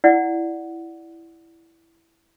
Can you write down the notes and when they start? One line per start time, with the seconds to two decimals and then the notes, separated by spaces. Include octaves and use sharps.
0.04 E4 D5 F#5